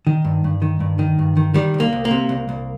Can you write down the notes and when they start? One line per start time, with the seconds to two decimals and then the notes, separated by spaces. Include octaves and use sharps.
0.07 D#3
0.25 G2
0.44 G2
0.62 D#3
0.80 G2
0.99 D#3
1.19 G2
1.37 D#3
1.54 D#3 G3
1.74 C2
1.80 A#3
1.93 C2
2.05 A#3
2.11 C3
2.29 C2
2.49 C2